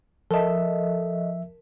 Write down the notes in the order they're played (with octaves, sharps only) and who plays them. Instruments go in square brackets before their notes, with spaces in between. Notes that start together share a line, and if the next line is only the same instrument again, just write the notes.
[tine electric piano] F3 E5 [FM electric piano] A4 D#5 [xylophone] A#4 A5